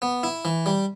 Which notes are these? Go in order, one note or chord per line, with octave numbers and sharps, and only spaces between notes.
B3
E4
E3
G3